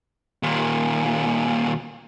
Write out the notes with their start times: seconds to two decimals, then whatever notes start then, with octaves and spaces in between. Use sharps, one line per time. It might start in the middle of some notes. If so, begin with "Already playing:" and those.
0.43 D#2 A#2